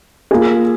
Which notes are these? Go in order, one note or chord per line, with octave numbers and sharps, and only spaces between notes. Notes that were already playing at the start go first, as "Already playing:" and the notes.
A#3 F4 G#4